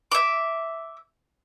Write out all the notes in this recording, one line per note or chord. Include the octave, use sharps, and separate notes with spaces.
E5 D6